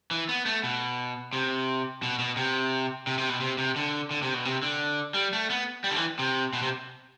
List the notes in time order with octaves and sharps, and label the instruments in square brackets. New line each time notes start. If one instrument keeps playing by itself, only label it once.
[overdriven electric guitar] E3
B3
A3
B2
C3
B2
B2
C3
C3
C3
B2
C3
C3
D3
D3
C3
B2
C3
D3
G3
A3
B3
G3
D3
E3
C3
B2
C3